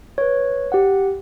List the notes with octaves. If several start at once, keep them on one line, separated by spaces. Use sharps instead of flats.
B4 C#5
G4 F#5